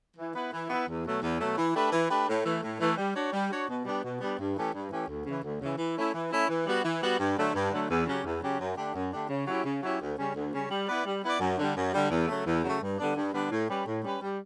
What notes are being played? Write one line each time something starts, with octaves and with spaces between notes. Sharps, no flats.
E3
B3 E4 B4
E3
B3 E4 B4
E2
B2 F#3 A3
E2
B2 F#3 A3
E3
A3 D4 G4 B4
E3
A3 D4 G4 B4
A2
E3 A3
A2
E3 A3
G3
D4 F#4 C#5
G3
D4 F#4 C#5
B2
G3 B3 D4 G4
B2
G3 B3 D4 G4
G2
E3 A3 C#4 G4
G2
E3 A3 C#4 G4
D2
C#3 E3
D2
C#3 E3
E3
A3 C#4 E4
E3
A3 C#4 E4
E3
G3 B3 F#4
E3
G3 B3 F#4
G2
D3 F#3 A3
G2
D3 F#3 A3
E2
C#3 F#3 C#4 G4
E2
C#3 F#3 C#4 G4
F#2
D3 A3 D4 G4
F#2
D3 A3 D4 G4
C#3
F#3 C#4 E4 G4
C#3
F#3 C#4 E4 G4
D2
C#3 G3 C#4
D2
C#3 G3 C#4
G3
B3 E4 B4 D5
G3
B3 E4 B4 D5
F#2
D3 G3
F#2
D3 G3
E2
C#3 F#3 A3
E2
C#3 F#3 A3
G2
D3 G3 B3 D4
G2
D3 G3 B3 D4
A2
G3 C#4 G4 B4
A2
G3 C#4 G4 B4
G3